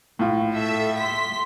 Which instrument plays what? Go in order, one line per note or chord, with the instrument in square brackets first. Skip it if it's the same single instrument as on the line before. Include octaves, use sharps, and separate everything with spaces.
[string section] A#1 [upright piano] A2 F4
[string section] A4 E5
C6 B6